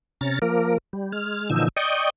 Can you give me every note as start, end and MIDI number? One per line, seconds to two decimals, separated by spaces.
0.21 0.39 48
0.21 0.39 61
0.21 0.39 82
0.21 0.39 93
0.42 0.78 53
0.42 0.78 58
0.42 0.78 70
0.93 1.12 55
1.12 1.50 56
1.12 1.50 89
1.50 1.68 46
1.50 1.68 50
1.50 1.68 52
1.50 1.68 53
1.50 1.68 63
1.50 1.68 88
1.77 2.10 74
1.77 2.10 75
1.77 2.10 79
1.77 2.10 85
1.77 2.10 87